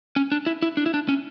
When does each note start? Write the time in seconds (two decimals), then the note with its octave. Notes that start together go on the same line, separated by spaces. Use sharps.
0.16 C#4
0.32 D4
0.46 E4
0.62 E4
0.77 D4
0.86 E4
0.94 D4
1.09 C#4